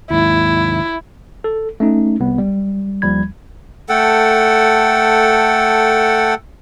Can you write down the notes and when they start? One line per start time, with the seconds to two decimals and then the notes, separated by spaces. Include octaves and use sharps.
0.11 D#2 G#2 E4
1.44 A4
1.80 A3 C#4 D#4
2.20 C2 B3
2.38 G3
3.02 D#2 F3 G3 B5 G#6
3.89 A3 A4 F#5 G5